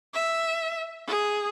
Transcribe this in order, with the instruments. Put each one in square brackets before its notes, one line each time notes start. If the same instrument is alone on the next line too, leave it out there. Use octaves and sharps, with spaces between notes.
[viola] E5
G#4